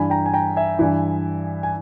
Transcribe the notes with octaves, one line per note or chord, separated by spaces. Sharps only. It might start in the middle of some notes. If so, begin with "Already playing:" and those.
Already playing: G2 E3 G#5 B5
G5 A#5
G#5
G5 A#5
E5 G#5
G2 E3
G#5